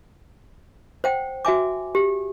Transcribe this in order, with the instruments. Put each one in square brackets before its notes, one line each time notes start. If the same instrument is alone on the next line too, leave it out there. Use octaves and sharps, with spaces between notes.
[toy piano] C5 F#5 G5
F#4 E5 G#5 D6
G4